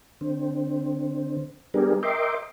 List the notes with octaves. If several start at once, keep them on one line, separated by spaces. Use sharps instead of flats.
D3 C4
G3 B3 D4 G4 G#4 A#4
A#4 D#5 E5 G5 C6 D6